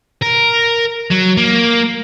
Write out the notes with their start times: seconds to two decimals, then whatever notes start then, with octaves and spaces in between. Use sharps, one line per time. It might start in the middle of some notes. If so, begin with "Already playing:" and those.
0.22 A#4
1.10 F#3
1.37 A#3